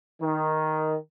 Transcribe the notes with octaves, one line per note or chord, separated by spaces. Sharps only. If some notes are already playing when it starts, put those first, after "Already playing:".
D#3